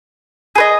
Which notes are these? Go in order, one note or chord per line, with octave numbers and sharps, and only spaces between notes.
G#4 B4 D#5